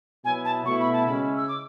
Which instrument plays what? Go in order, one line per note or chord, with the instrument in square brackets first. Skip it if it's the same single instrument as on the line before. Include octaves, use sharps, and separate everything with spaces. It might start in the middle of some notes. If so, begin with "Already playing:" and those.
[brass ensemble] B2 F#3 B3 E4 [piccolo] G#5
[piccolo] A5
[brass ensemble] B2 A3 E4 [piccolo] C#6
[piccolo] B5
A5
[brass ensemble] C#3 G#3 C#4 E4 [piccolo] B5
[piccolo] E6
D6